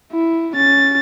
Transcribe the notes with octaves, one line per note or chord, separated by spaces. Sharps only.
E4
C#4 A6